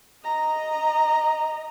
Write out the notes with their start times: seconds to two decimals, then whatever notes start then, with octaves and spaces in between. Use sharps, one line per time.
0.24 D#5 A#5